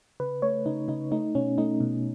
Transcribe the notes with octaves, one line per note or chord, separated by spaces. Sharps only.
C#3 B4
A3 C#5
C#3 D#4
C#3 D#4
A3 D#4
B2 C#4
A3 D#4
B2